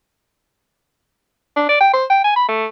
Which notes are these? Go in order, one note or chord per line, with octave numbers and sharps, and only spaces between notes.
D4
D5
G5
C5
G5
G#5
B5
A3